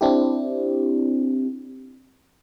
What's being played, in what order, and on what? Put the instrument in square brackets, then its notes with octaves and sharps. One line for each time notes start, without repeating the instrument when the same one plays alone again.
[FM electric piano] C4 D4 E4 G4